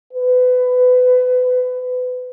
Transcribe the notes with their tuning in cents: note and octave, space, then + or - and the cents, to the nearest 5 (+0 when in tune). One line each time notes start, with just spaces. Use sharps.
B4 +25